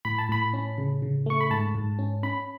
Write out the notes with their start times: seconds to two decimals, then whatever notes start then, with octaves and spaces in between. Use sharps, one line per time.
0.05 A2 B5
0.18 A5
0.29 A2 B5
0.54 C#4
0.78 C#3
1.02 C#3
1.26 A3 C#6
1.41 B5
1.50 G#2 A5
1.75 G#2
1.99 C#4
2.23 C#4 B5